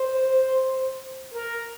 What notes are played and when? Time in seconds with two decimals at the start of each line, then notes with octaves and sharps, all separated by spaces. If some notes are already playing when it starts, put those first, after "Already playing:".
Already playing: C5
1.33 A#4